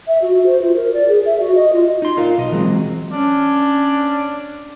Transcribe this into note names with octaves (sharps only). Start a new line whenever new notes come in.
E5
F#4
F#4
C5
F4
A#4
D5
G#4
E5
F#4
D#5
F4
D#4 C6
F4 A#4 F5
B1 D#5
E3 F#3 G#3 C4
C#4 D4